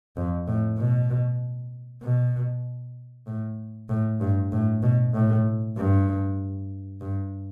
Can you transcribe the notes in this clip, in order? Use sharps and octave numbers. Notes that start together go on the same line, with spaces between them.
F2
A2
B2
B2
A2
A2
G2
A2
B2
A2
G2
G2